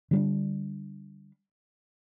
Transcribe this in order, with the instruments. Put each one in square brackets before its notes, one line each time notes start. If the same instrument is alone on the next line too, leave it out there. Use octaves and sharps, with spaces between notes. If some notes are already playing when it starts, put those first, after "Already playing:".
[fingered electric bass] D3 G3 D4